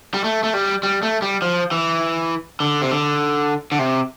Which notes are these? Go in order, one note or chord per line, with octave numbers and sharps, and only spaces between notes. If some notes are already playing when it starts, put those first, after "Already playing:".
G3
A3
A3
G3
G3
A3
G3
F3
E3
D3
C3
D3
D3
C3